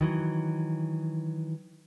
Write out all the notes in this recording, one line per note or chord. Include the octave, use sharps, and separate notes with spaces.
D#3 E3 F#3